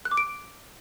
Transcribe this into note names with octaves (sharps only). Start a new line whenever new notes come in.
F#6
D6
D7